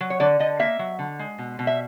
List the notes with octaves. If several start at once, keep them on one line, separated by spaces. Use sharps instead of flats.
F#3
C#5
D3 D5
D3 D#5
A#3 E5
F#3
D3
G#3
B2
B2
E5